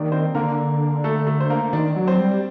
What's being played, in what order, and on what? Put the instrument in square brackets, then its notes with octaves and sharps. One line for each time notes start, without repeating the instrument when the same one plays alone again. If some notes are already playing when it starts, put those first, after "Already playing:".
Already playing: [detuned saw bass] D#3 [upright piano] G3 A#3 D4 A#4 D5
[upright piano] C4 C5
[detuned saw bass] D3 [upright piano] A#3 A#4
[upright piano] A3 A4
A3 A4
C5
A#3 A#4
[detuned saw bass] D#3 [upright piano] D4 D5
[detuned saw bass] F#3
[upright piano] C4 C5
[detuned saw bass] G3